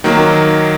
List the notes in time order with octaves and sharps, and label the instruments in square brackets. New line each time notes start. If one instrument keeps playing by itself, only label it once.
[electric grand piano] D#3 F#3 A#3